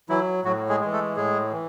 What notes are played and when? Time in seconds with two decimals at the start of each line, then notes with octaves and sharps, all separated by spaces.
0.09 E3 F#3 E4
0.44 A2 F#3 F#4
0.69 G#3 G#4
0.81 E3 G#3
0.93 A3 A4
1.16 A2 G#3 G#4
1.52 E3